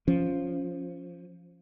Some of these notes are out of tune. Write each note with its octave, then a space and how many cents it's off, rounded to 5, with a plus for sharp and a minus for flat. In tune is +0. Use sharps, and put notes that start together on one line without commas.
F3 +0 C#4 +0